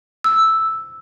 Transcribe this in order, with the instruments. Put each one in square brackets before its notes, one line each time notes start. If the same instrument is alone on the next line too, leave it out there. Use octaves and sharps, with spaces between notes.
[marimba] E6